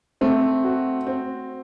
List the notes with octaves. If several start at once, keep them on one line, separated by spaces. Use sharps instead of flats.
A3 C4
F#4
C4